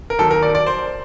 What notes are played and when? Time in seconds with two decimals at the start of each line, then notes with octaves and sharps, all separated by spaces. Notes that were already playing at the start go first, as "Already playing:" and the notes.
0.10 A#4
0.19 D#2 D#3 F#3 A4
0.31 A#4
0.43 D5
0.55 D5
0.66 C5